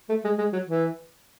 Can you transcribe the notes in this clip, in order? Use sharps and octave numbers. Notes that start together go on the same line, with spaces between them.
A3
G#3
G#3
F#3
E3